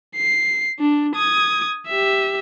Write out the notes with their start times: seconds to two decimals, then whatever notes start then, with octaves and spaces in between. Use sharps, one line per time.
0.16 C7
0.79 D4
1.15 D#6 G#6
1.87 G4 E5